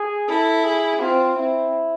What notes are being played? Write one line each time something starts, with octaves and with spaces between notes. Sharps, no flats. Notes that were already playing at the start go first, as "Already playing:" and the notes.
Already playing: G#4
E4 A4
G#4
C4 F4
C4 E4